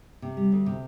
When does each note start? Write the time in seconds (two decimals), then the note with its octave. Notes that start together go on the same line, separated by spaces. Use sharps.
0.22 C3
0.37 G3
0.52 D2
0.66 C3